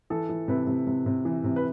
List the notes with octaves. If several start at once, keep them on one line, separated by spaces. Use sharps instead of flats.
E3 A4
E3
C3 B4
C3
C3
C3
E3
C3
B4